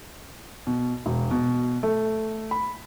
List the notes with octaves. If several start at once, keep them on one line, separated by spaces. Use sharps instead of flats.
B2
E1
B2
A3
B5